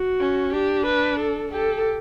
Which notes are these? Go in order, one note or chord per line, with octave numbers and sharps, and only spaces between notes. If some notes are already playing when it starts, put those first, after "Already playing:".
Already playing: F#4
C#4
D4 G4
B4
A4
G4 A4